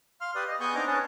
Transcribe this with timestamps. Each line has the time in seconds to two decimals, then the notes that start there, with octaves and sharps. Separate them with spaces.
0.21 F5 C6 F6
0.35 G4 B4 D5 D#6
0.47 D#5
0.60 B3 G#4 G#5 C#6 D#6 G6
0.75 C4 D4 D#4 A#5 D6
0.87 C#4 G#4 B4 C#5 A5